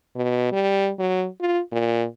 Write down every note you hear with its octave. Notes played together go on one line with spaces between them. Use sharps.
B2
G3
F#3
F4
A#2